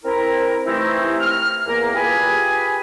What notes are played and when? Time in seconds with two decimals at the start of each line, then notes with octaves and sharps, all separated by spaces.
0.04 C4 E4 A#4
0.66 C3 E3 A3 C4 D#4 E4
1.20 F6
1.66 E2 A#3 A#4
1.94 F4 G4 G#4 B4 G#5